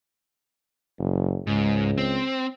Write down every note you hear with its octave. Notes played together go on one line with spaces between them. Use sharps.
F#1
C#2 G#2
C4